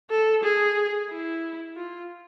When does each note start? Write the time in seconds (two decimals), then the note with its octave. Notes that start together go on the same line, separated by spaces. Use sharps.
0.10 A4
0.44 G#4
1.10 E4
1.76 F4